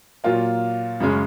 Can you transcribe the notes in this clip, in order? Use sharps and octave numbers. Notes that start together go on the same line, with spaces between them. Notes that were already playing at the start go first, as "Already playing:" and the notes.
A#2 F#3 A#3 F4
F#2 C#3 G#3